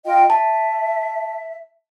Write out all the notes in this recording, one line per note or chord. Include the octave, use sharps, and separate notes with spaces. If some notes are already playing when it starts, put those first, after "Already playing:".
F4 D#5 G5
E5 A5